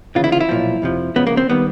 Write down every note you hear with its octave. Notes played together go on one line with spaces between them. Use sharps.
D2 C#3 E3 F4
E4
F4
E4
B1 A#2 F3
F2 C3 F3
C#2 C#3 F3 B3
A#3
C4
D#3 G3 B3